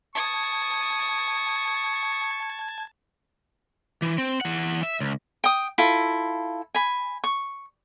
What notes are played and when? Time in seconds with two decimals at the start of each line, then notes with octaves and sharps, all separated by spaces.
0.15 A5 C#6 D#6 G#6
4.02 E3
4.18 C4
4.41 E3 F#5
4.83 E5
5.00 C#2
5.44 G5 D#6
5.78 E4 F4 A4
6.75 G#5 B5
7.24 C#6